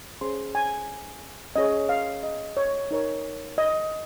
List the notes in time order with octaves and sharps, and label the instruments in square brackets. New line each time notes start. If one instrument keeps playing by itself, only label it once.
[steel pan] C#4 G#4 C5 C6
G#5
C#4 G#4 C#5 D#5
F5
D#5
C#5
D#4 A#4 C#5
D#5